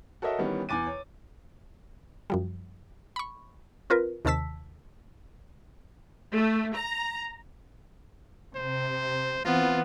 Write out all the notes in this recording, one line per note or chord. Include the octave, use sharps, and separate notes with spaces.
F#4 A4 A#4 C#5 D#5 E5
D#3 E3 G3 B3 C#4
E2 G#5 D6 A6 D#7
C#5
F#2 F3 G3
B5 C#6
C4 F4 A#4 B4
D#2 C3 D#3 A5 E6 B6
A3
A#5
C3 C5
E3 B3 C4 F4